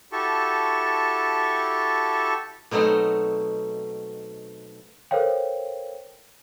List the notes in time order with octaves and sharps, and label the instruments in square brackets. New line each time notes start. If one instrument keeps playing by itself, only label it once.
[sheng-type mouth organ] E4 F#4 G4 A4 A5 C#6
[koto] B2 F#3 A3 C4 D#4
[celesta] A4 A#4 C5 C#5 F5 G5